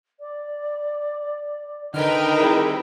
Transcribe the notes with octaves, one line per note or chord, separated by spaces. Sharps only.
D5
D3 D#3 A#4 B4 D#5 G5 F6
G3 C4 E4 G#4